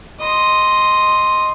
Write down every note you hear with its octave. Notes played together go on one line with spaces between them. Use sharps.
D#5 C6